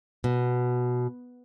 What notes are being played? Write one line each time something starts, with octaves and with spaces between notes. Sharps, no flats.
B2